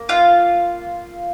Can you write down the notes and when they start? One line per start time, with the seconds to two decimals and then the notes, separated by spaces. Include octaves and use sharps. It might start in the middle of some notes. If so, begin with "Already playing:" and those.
Already playing: A#3
0.09 F4 F5